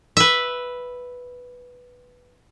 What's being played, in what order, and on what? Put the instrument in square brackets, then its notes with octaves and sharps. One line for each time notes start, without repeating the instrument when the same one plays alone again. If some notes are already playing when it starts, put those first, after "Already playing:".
[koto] B4 E5